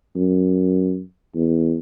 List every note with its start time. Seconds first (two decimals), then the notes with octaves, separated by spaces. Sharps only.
0.16 F#2
1.36 E2